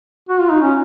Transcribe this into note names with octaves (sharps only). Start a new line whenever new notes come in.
F#4
F4
D#4
C#4